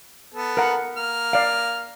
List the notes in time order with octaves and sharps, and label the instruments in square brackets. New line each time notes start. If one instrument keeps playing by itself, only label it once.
[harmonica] B3 A4
[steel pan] A#4 F#5
[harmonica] A#3 F6
[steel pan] D5 F5